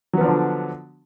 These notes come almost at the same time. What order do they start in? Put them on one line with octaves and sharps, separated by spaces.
F#3 B3 F3 D4 D3